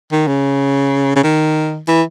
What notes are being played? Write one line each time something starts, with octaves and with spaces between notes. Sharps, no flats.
D#3
C#3
C#3
D#3
E3